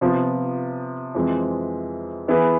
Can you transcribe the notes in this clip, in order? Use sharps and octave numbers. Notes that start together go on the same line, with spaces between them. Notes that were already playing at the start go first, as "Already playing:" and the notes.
C3 F3 B3 F4
F2 E3 G#3 C4
E3 B3 E4 G#4 B4